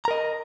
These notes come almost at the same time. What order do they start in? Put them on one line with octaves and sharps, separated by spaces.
A#5 A#4 D#5